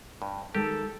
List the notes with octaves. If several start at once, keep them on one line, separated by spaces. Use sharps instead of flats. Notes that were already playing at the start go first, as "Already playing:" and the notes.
G2
D#3 G#3 G4 A4